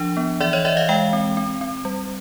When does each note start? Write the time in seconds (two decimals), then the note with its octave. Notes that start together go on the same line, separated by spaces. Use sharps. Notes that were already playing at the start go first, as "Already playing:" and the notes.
Already playing: F3 D4
0.17 B3
0.40 E3 D5 E5
0.53 C#5 D#5
0.65 E3 D5 E5
0.77 D#5 F5
0.89 G#3 F5 G5
1.13 C4
1.37 C4
1.61 C4
1.85 G3